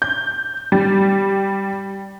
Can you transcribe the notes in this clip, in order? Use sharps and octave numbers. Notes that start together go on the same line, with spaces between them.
G6
G3